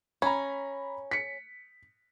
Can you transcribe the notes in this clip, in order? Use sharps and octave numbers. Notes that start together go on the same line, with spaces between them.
C#4 A#5 B5
B6 C#7